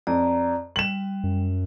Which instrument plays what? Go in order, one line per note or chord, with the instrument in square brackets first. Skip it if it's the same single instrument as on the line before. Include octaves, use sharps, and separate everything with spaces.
[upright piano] F2 [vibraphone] D5 A#5
[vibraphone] G3 [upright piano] E7 F#7
[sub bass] F#2